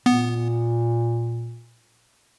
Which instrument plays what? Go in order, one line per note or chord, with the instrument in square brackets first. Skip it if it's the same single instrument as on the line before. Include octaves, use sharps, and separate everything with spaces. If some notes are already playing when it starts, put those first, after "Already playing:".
[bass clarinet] A#2 [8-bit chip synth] B3